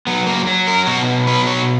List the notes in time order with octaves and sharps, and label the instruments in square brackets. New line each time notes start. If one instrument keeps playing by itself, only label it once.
[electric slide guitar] F#3 B3
A#3
F#3
A#4
B2 F#4
F#3 B4
C#5